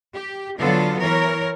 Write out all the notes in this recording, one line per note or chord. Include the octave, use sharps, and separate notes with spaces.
G4
D3 F#3 B3 F4 A4
E3 A#4 C#5